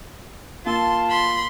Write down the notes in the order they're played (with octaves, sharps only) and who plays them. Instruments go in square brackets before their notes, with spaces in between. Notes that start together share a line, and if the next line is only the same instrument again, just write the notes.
[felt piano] A#3 [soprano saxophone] F4 [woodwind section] A5 [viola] C6
[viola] B5 C6